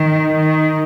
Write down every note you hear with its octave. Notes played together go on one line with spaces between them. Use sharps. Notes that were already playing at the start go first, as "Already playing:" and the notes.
Already playing: D#3
D#3